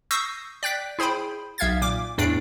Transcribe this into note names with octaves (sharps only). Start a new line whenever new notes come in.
C#6 D#6 E6 G6 A#6 C7
D5 G5 F#6 B6
E4 G#4 C5 G5 B5
B1 E5 F5 G#6 A6
A#2 D6
E2 A2 D4 C7 D7